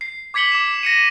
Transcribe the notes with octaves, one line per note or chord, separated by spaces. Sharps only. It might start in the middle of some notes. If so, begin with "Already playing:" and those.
C7
D6 G#6 B6 C#7 F#7 G7
D6 E7
A#6 C#7 D#7